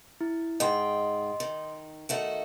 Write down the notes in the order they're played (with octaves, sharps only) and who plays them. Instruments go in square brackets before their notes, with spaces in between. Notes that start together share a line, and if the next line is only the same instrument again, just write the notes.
[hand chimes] E4
[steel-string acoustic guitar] G#2 G5 [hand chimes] D#5 C6
[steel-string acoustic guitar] D#3
D#3 A3 F#4